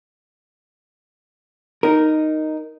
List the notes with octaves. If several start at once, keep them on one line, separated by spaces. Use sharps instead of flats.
D#4 A#4